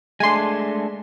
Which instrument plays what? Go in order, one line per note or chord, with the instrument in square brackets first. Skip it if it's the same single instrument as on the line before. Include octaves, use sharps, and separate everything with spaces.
[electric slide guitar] G#3 A3 D4 [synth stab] G#5 C6